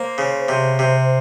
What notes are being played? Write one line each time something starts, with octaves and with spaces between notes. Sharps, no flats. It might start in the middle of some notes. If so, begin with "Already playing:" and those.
Already playing: A#3 C5
C#3
C3
C3